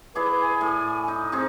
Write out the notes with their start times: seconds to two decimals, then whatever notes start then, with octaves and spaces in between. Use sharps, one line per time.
0.15 E4 G#4 B4 D5
0.41 G#5
0.61 A2
1.08 D#4
1.32 C4 D#4 G#4